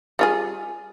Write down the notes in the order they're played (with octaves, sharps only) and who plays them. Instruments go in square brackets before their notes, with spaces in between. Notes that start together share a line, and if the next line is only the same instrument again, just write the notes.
[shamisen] G3 F4 G#4